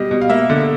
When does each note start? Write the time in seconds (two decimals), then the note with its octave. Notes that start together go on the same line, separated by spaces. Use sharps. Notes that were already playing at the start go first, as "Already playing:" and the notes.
Already playing: B2 G3 D#5
0.11 B2
0.21 F5
0.30 A#3 E5
0.50 D3